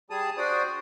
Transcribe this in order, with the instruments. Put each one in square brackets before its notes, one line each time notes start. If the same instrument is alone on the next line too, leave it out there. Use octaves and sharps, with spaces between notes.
[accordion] G3 G#4 A5 D#6
D4 F#4 C5 D5 D#6